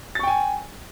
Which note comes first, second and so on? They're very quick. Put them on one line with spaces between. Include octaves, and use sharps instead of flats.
A6 C#6 G5 G#5